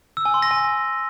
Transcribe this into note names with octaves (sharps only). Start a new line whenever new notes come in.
E6
G#5
C6
A#6
G#5